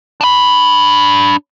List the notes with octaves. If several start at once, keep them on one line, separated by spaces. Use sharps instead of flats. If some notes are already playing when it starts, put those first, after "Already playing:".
D4 B5